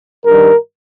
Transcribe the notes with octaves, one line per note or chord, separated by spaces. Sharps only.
G2 D#3 G3 A#4